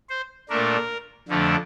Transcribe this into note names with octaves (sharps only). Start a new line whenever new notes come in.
C5
A#2 A3 D4 A#4
F2 D3 F3 A3 D4